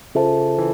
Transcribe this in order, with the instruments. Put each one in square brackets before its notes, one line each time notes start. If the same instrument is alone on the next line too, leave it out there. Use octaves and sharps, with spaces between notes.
[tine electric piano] C#3 [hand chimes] F4 A4 C5 E5 A5
[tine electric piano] E3